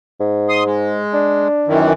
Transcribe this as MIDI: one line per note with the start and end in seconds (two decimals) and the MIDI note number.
0.20 1.01 44
0.49 0.64 84
0.49 0.64 87
0.65 1.48 56
1.13 1.81 62
1.67 1.93 42
1.67 1.93 51
1.67 1.93 52